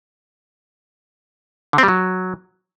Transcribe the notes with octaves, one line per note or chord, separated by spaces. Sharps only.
D3
C4
G3
F#3